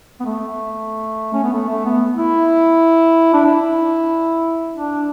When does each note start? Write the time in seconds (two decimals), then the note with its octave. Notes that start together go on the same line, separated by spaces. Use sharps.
0.20 B3
0.25 A3
1.34 C#4
1.43 B3
1.53 A3
1.69 A3
1.85 B3
2.17 E4
3.34 D4
3.45 E4
4.74 D4